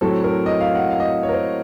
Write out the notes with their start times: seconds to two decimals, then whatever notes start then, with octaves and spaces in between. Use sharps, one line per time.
0.01 A2 F#3 C4 A4
0.24 A#4
0.46 D#5
0.61 F5
0.75 F#5
0.90 F5
1.00 D#5
1.23 C#5
1.29 A#4
1.33 C5